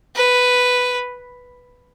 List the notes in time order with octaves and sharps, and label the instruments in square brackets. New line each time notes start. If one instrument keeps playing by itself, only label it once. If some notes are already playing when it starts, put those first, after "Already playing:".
[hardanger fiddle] B4